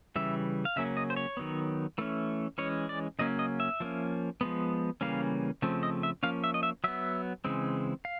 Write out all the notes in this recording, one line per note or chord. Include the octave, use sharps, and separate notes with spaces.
C#3 E3 G3 E5
F5
C#3 F#3 A#3 C#4 E5
D#5
C5
C#5
D#3 F#3 B3
E3 A3 C#4
E3 G#3 C#4 C#5
D5
C#3 F#3 A#3 C#4 D#5
D#5
E5
F3 A#3 C#4
F3 G#3 B3
C#3 E3 G3 A#3 C#4 F5
C#3 F3 A3 C4
D#5
E5
F3 A#3 C#4 F5
E5
D#5
E5
F#3 B3 E5
C#3 E3 G#3 C4
F5